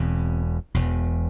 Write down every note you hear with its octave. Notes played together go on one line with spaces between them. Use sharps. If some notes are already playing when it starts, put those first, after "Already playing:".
Already playing: E1 E2 B2 C4
E1 E2 B2